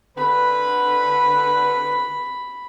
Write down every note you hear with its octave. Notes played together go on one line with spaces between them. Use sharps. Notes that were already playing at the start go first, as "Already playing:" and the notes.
D3 B4 B5